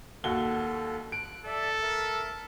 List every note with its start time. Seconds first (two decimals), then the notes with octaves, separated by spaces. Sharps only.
0.24 D#2 F#4 A4 G7
1.12 F#6 D7
1.46 A4 D5 E5
1.82 A#4 E5